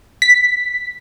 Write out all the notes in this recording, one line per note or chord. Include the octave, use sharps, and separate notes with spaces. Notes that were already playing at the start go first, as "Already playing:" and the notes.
B6